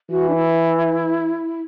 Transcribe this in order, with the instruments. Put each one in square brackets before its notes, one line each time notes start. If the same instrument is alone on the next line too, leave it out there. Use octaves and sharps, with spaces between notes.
[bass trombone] E3 [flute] F#4
[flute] D4
E4